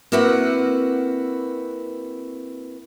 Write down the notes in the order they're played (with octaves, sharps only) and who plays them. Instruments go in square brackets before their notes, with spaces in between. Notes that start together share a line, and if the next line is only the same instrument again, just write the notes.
[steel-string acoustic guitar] A#3 C4 E4 F#4 B4 F#5